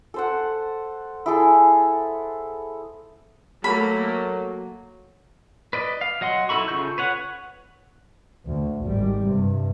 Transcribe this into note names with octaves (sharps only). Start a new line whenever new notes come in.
A4 C5 F#5
E4 G#4 A4
F#3 A3 A#3 B5
B4 D5 D#5
F5
F#3 D#5 F#5 C6
D#4 E4 A4 B5 C#6
C#3 F4 A4 C#6 G6
B4 C#5 F#5
D2
G#1 G3
G2 C3